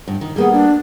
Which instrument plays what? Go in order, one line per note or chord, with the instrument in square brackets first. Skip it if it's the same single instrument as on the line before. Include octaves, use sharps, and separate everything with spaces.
[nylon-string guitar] G2
D#3
[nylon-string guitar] G3 A#3 B3 [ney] G#4
[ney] D4